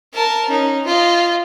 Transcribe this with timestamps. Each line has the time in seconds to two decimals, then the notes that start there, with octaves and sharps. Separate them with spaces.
0.13 A#4 A5
0.48 C#4 D#4
0.86 F4 D#5